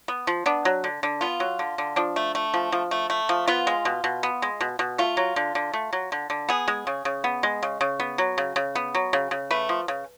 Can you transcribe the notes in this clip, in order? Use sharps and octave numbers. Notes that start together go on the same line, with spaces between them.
B3
F3
B3 D4
F#3
D3
D3
B3 F4
F#3
D3
D3
F3 D4
A3
A3
F3
F3
A3
A3
F3
B3 F4
G#3
B2
B2
B3
G#3
B2
B2
A3 F4
F#3
D3
D3
A3
F#3
D3
D3
B3 G#4
G#3
C#3
C#3
B3
G#3
C#3
C#3
B3
F#3
C#3
C#3
B3
F#3
C#3
C#3
A3 B4
F3
C#3